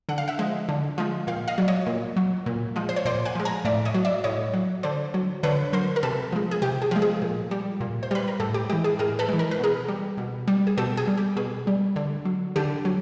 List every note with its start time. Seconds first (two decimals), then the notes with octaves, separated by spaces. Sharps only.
0.09 D3 F#5
0.18 F5
0.28 E5 F#5
0.39 F3 G#3
0.69 D3
0.98 F3 G#3
1.27 A#2 F5 G5
1.48 D#5 F5
1.58 F#3 D5
1.68 C#5 D#5
1.86 A#2
2.16 F#3
2.46 A#2
2.76 F3 G#3
2.89 C5
2.96 C#5
3.05 A#2 C5 D5
3.25 F#5 G#5
3.35 F3 G#3
3.45 G#5 A#5
3.65 A2 D5 E5
3.85 C#5 D#5
3.94 F#3
4.05 D5 E5
4.24 A2 C#5 D#5
4.54 F#3
4.83 D3 C5 D5
5.14 F#3
5.43 D3 B4 C#5
5.73 F#3 A#4 C5
5.96 A#4
6.03 C3 A4 B4
6.32 F3 G#3
6.51 G#4
6.62 C3 G4
6.82 G#4
6.91 F3 G#3
7.02 G#4
7.22 A#2
7.51 G3
7.80 A#2
8.03 C5
8.11 G3 B4
8.28 A#4
8.40 A2 G4 A4
8.54 G4
8.70 G#3 G4
8.73 E3
8.84 G#4
8.99 A2 G#4 A#4
9.19 A4 B4
9.29 E3 G#3
9.39 A#4
9.51 B4
9.59 B2 G#4 A#4
9.88 G3
10.18 B2
10.48 G3
10.67 G#4
10.77 B2 G4 A4
10.97 G#4
11.07 G3
11.18 G4
11.36 B2 G#4
11.67 G3
11.96 D3
12.25 F#3
12.56 D3 G4 A4
12.85 F#3